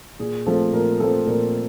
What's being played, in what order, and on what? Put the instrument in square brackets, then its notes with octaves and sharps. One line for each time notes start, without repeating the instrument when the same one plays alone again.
[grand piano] A#2 G#4
F3 A3 C4 A4
A#2 A#4
F3 A3 C4 A4
A#2 A#4